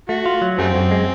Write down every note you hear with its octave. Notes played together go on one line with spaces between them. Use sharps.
A3 F#4
F4
F#3
F#2 G3 A3 C4
F#2
G#3